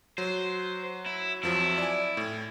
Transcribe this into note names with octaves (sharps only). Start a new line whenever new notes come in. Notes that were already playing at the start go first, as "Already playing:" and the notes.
F#3 C5
E4
F2 F3 F#3 E4
D5 G#5
A2